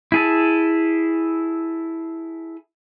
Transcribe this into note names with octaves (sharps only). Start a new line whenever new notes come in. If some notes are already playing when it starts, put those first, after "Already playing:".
E4 G#4 A4